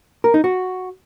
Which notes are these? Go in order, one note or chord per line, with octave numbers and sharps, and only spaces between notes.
A#4
D#4
F#4